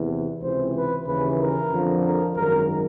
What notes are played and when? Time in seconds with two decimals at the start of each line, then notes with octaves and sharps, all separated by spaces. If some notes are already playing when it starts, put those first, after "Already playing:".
Already playing: E2 C3 E3
0.41 C#2 C3 E3 C5
0.74 B4
1.06 D#2 C#3 E3 B4
1.39 A#4
1.70 F2 D3 F3
2.04 A#4
2.35 G#1 F#2 D#3 A#4